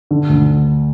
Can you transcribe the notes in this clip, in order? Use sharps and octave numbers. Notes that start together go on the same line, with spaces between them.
D3
D2